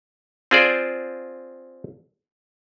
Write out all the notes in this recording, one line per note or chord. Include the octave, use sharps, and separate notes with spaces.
C4 F4 G#4 C5 D5